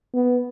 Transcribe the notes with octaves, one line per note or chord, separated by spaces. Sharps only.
B3